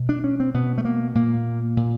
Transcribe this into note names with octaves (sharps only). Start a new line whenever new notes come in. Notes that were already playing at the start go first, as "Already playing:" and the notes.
Already playing: B2
D4
C#4
C4
B2 B3
A3
A#3
A#2 A#3
A#2